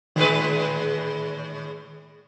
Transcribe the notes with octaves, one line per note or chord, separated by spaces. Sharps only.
A2 D#3 G#3 B4